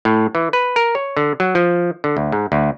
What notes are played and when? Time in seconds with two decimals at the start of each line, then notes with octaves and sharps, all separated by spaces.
0.05 A2
0.35 E3
0.53 B4
0.76 A#4
0.95 C#5
1.17 D3
1.40 F#3
1.55 F3
2.04 D3
2.17 D2
2.32 G#2
2.52 D2